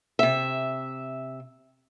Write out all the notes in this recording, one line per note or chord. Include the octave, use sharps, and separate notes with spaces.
C3 E5